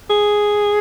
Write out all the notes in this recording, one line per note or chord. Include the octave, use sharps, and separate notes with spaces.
G#4